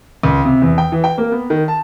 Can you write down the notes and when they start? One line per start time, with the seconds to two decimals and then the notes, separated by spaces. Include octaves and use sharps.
0.23 C#2
0.45 C3
0.62 E2
0.78 G5
0.92 E3
1.04 G5
1.18 A#3
1.32 B3
1.50 D#3
1.68 A5